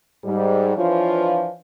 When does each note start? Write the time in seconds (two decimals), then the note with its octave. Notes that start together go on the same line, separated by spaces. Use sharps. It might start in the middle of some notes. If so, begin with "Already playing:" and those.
0.25 G#2 G3
0.77 E3 F3 D4 F4 B4 C#5